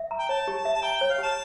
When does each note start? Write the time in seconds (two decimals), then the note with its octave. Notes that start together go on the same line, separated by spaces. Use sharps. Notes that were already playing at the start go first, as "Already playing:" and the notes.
Already playing: E5
0.11 A#5
0.19 G5
0.29 C#5 A5
0.48 G4
0.55 A5
0.65 E5
0.73 A5
0.83 G5 A#5
0.97 C#5 G5
1.10 F5
1.19 G4 A5